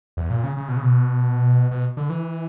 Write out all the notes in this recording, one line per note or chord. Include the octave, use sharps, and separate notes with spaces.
E2
A#2
C#3
C#3
B2
C#3
B2
B2
D3
E3